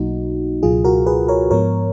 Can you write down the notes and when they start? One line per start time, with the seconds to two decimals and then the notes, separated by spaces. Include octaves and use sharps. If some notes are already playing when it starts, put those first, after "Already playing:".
Already playing: B1 B2 F#3 A#3 D#4 F#4
0.63 C#2 B2 F#3 F4 G#4
0.84 F#4 A#4
1.06 G#4 B4
1.28 A#4 C#5
1.51 G#2 F3 B3 A#4 C#5